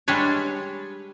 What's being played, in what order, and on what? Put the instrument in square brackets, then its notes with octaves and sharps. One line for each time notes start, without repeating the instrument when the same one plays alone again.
[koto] G3 G#3 D4 B4 C#5